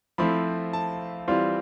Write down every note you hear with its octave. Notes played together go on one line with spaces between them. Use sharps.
F3 A3 C4 E4 B5
A5
E3 G3 C4 F4